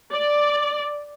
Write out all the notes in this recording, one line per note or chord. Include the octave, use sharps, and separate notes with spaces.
D5